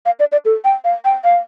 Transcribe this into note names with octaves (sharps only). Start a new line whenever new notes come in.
F5
D5
D5
A4
G5
F5
G5
F5